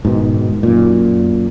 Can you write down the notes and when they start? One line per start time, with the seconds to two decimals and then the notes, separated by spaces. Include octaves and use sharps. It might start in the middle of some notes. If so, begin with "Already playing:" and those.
0.05 G#2 B2 D#3
0.63 F#2 A#2